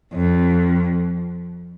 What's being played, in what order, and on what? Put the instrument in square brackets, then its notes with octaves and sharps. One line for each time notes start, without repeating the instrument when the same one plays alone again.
[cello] F2